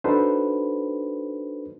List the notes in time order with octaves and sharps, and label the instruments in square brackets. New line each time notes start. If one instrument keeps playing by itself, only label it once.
[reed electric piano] D4 D#4 F#4 A4 B4 C5